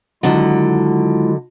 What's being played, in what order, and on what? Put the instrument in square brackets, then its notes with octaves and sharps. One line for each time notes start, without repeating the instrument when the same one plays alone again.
[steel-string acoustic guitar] D3 D#3 F#3 [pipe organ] G#3 E4 F4